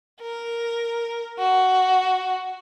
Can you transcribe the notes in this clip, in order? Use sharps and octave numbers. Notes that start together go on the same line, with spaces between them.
A#4
F#4